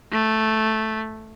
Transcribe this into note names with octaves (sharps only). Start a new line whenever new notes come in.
A3